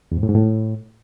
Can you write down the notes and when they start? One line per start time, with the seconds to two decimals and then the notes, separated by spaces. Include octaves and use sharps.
0.12 E2
0.17 G#2
0.23 A2
0.29 G#2
0.35 A2